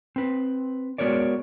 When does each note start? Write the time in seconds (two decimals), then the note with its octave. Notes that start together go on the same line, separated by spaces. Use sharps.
0.16 C4 B4
0.98 G#3 B3 F#4 A#4 C#5 D5